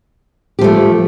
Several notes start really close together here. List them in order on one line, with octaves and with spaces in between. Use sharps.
G4 F3 A3